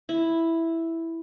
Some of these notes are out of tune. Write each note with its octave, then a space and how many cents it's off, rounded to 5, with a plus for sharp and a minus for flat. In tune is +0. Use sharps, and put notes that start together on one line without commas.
E4 +0